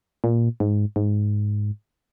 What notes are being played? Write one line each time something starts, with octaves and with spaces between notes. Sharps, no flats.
A#2
G#2
G#2